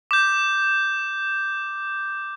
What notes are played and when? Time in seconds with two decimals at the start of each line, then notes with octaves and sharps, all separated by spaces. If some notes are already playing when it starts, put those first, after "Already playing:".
0.11 D6 G6